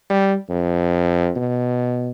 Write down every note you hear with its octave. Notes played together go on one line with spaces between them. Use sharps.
G3
F2
B2